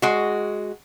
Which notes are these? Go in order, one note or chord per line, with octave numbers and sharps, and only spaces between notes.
G#3 F#4